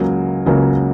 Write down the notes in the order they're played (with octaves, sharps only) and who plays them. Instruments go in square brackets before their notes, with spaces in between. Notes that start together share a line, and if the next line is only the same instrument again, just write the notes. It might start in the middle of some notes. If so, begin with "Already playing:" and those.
Already playing: [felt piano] C#2 C#3 F#3 A#3
C#2 C#3 F#3 A#3